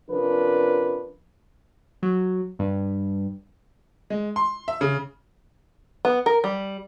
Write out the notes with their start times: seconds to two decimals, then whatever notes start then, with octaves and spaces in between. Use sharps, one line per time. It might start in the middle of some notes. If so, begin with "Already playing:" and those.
0.10 C3 F3 C#4 D4 A#4 B4
2.03 F#3
2.59 G2
4.10 G#3
4.36 C6
4.68 E5
4.81 C#3
6.05 B3
6.26 A#4
6.44 G3